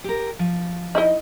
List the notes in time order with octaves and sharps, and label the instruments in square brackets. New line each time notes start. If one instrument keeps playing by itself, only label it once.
[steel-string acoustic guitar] G4 A#4
F3
[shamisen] D#4 E4 D#5